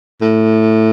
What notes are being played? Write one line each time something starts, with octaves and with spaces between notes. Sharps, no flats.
A2